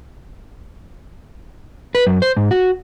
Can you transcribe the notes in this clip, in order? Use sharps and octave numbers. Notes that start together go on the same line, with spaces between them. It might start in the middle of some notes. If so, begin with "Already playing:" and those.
B4
F#2
C5
G#2
F#4